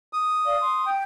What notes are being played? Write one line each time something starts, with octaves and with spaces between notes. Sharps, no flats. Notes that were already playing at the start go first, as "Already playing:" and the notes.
D#6
D5 F5
C6
G5